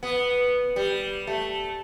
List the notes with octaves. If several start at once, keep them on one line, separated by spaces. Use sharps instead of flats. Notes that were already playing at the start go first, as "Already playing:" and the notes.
B3
G3
A3